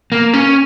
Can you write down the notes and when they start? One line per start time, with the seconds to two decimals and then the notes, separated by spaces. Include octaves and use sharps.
0.12 A#3
0.34 C#4